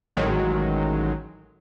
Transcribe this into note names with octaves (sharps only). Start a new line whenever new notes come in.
A1 D#3 F#3 G#3